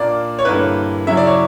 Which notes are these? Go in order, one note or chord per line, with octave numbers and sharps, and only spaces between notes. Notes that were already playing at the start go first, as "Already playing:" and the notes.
Already playing: A#2 A#3 D4 D5
C#5
G2 D3 A#3 E4 B4
C#3 F#3 C#4 E4 E5
D5
C#5